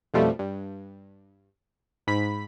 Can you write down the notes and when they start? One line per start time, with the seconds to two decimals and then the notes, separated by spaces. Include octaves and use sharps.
0.14 F2 B2 F3 G3 A3
0.39 G2
2.07 G#2 B5 B6